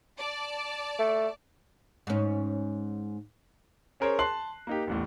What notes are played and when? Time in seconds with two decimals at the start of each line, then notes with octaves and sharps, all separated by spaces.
0.18 D5 A5
0.99 A3
2.07 G#2 C#4
4.00 C#4 G#4 A#4 C5 C#5
4.19 A5 C6 F#6 C7 F#7
4.67 A#3 D#4 G4
4.87 A1 E2 A2